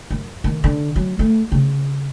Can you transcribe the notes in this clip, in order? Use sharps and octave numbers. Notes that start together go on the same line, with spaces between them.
F#2
D#3
D3
F#3
A3
C#3